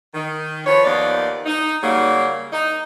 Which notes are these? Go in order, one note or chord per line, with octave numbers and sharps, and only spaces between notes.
D#3
F3 B4 C#5
D#2 D#3 F3 B3 D5
D#4
C#3 F#3 G3 A#3
D#4